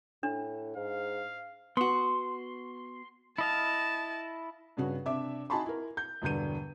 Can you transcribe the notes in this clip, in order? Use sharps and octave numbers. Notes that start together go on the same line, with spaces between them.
A2 D4
G#2 F5
B3 F#4 C6
E4 D#5 F5 A5
G2 C#3 C#4 F#4
C3 D4 E5 D6
D#4 F#4 G#5 A5 B5 C6
E4 A#4
G6
E1 G2 D3 G6 D#7